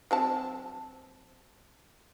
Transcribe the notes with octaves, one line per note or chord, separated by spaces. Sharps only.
F#3 C4 A5